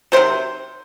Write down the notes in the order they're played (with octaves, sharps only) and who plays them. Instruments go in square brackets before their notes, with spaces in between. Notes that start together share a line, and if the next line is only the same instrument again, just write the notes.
[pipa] C3 D#3 F#3 C5